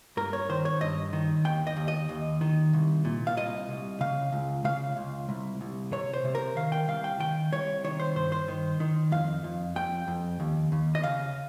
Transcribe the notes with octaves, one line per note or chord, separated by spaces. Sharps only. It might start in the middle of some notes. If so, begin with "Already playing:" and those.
G2 A#4
C#5
D#3 C5
C#5
G2 D#5
D#3
D#2 G5
D#5
D#2
D#5
D#2
D#3
C2
A#2
F5
C2 D#5
C2
C#3 F5
C#2
C#3 F5
C#2
C2
C2
C3 C#5
C5
C3
A#4
D#3 F5
G5
C2 F5
G5
D#3 G5
C2 C#5
D#3 C#5
C5
G2 C5
C5
D#3
D#3
F2 F5
F2
F2 G5
F2
D#2
D#2
D#5
C#3 F5